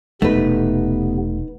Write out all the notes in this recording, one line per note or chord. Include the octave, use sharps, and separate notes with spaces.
E1 C3 A3 B3 D#4 B4